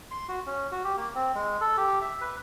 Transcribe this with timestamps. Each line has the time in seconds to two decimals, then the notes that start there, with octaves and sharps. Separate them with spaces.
0.11 C6
0.28 F#4
0.47 C#4
0.71 F#4
0.84 G4
0.97 A#3
1.15 C4
1.35 G#3
1.61 A4
1.77 G4
2.01 E5
2.21 B4